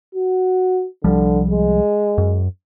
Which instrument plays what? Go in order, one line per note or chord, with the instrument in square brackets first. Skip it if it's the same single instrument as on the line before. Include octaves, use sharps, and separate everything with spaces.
[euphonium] F#4
[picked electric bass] C2 F3 G3 [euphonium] D3
[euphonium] G#3
[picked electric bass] F#2